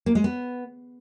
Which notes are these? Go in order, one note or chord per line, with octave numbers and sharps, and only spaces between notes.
A#3
G#3
B3